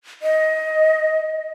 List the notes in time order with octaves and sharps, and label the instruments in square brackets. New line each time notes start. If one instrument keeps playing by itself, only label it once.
[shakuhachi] D#5